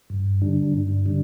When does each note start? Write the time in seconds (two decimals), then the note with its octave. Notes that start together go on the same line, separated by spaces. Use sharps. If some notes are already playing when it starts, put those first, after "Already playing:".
0.10 G2
0.42 D3 G3 D4
0.74 G2
1.06 D3 G3 D4